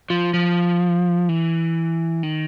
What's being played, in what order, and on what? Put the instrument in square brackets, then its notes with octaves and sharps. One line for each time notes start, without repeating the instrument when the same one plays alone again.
[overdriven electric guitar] F3
F3
E3
D#3